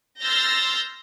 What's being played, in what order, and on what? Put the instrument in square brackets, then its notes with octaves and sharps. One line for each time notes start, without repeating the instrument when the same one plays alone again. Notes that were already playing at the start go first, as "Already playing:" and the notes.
[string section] C6 E6 F6 G6 A6 A#6